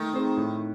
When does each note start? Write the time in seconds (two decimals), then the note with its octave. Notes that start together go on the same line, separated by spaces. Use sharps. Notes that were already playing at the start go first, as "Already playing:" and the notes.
Already playing: D#3 A3
0.14 C4 D#4 G#4 C5
0.37 A2